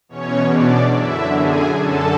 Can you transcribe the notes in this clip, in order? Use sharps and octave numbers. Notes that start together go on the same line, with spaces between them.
E2 B2 C#4 C#5
D4 D5
F#2 D3 E4 E5
G#4 G#5
F#2 D3 A4 A5